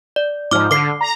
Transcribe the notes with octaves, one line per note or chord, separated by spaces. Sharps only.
D5
G#2 F3 D6 F6
D3 D6 C7
A#5